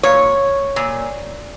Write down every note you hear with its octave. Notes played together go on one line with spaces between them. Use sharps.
A#2 C#5
A#2